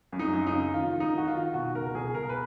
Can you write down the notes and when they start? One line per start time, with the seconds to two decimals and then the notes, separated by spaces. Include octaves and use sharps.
0.13 F#2
0.19 D#4
0.33 F#2
0.47 D#4
0.53 C#3
0.73 D#3 F4
0.94 D#3
1.00 D#4
1.13 D#3 F#4
1.28 F4
1.34 D#3
1.54 B2 F#4
1.75 C#2 A#4
1.95 B2 G#4
2.15 B2 A#4
2.29 B4